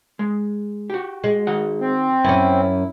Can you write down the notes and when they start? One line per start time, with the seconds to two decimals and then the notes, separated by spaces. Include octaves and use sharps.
0.19 G#3
0.90 F#4 G4
1.24 G#3
1.47 D#3 F#4 F#5
1.81 C4
2.24 F#2 C#4 E4